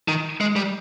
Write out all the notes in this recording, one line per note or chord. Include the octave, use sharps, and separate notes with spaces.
D#3
G#3
G3